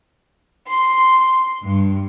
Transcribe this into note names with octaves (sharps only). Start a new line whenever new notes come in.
C6
G2